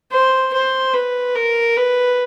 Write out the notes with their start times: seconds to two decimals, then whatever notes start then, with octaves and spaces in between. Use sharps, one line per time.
0.11 C5
0.53 C5
0.94 B4
1.35 A#4
1.76 B4